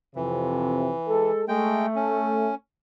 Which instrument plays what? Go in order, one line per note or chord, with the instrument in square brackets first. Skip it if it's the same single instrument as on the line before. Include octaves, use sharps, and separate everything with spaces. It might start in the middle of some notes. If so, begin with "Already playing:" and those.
[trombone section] F2 C3 [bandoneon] E3
[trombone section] G#3 A4
[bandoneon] G#3 G5 [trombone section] A3
[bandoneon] C#4